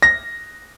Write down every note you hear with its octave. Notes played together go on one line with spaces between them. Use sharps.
A#6